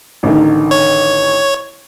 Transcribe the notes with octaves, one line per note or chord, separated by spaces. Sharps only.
A1 D3 D#3
C#5